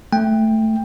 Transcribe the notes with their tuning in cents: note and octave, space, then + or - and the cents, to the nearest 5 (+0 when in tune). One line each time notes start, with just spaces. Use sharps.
A3 +0 G5 +15